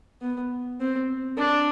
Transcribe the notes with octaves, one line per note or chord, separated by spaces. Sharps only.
B3
C4
D4